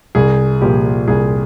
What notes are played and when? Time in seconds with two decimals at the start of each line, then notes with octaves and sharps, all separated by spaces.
0.15 C2 G#4
0.61 A#2 F3 G4
1.08 C2 G#4